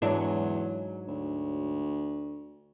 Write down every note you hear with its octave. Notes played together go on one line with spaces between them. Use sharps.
E2 G#2 F#3 D4
D2